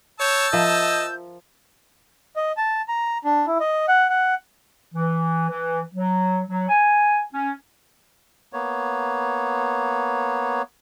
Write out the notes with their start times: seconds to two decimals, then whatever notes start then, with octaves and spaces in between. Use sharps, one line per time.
0.20 C#5 A5 E6 G6
0.53 F3 A#4 D#5 E5
2.36 D#5
2.57 A5
2.88 A#5
3.24 D4
3.47 E4
3.60 D#5
3.88 F#5
4.09 F#5
4.94 E3
5.49 E3
5.94 F#3
6.49 F#3
6.69 G#5
7.33 C#4
8.53 A#3 B3 C#5